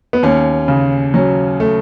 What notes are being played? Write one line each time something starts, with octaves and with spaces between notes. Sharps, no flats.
B3
D#2 C#4
C#3
F#3 C#4
A3